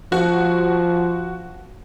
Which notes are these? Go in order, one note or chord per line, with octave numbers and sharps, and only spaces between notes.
F3 F#4